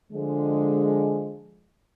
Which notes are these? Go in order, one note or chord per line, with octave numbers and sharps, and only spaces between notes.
D3 F3 G#3